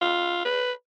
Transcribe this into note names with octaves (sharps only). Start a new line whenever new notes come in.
F4
B4